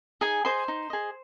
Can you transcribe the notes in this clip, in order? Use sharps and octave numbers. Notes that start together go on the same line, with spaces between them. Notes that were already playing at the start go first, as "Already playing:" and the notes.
D#4 G#4 G#5
G#4 C5 D#5 C6
D#4
G#4 D#5